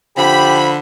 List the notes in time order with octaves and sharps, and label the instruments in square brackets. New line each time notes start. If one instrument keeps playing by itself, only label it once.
[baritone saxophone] D3 [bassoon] F3 [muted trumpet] G4 [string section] B5